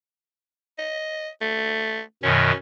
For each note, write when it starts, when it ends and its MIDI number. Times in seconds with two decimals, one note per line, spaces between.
0.79 1.28 75
1.41 2.01 57
2.23 2.52 42
2.23 2.52 47
2.23 2.52 51
2.23 2.55 61